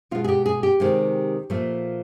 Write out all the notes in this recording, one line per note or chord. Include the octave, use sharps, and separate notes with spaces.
B2 G#3 F4
G#4
G4
G#4
G4
C3 D#3 G#3
A#2 F3 A3